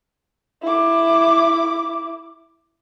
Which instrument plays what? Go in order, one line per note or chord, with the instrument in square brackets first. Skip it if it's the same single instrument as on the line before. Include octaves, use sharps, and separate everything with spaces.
[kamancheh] E4 D6